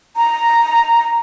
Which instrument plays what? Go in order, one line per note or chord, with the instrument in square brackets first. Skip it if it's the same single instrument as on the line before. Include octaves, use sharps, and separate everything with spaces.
[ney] A#5